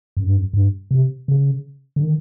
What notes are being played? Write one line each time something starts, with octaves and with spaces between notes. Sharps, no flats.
F#2
G2
F#2
G2
C3
C#3
D3
D#3